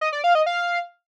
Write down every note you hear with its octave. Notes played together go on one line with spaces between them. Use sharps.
D#5
D5
F5
D#5
F5